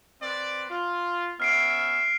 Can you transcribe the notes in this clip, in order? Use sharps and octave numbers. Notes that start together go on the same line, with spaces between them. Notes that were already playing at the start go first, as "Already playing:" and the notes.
C4 B4 D5
F4
B3 C#4 E5 F6 C7 D7